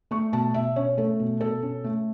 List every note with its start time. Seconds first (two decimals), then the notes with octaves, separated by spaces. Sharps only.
0.11 A3 C#6
0.32 B2 A5
0.54 B2 E5
0.76 C#4 C#5
0.98 A3 A4
1.20 B2
1.41 B2 A4
1.62 C#4
1.84 A3